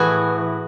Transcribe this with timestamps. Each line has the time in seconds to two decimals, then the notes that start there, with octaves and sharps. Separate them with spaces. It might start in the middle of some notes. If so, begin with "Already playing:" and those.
Already playing: A2 E3 F#4 G#4 B4